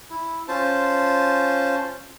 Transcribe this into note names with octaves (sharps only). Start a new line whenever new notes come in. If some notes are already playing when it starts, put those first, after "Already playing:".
E4
C#4 F4 C5 A5